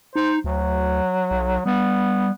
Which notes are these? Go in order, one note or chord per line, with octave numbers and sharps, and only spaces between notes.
D#4 C5
D2 F#3
B1
G3 B3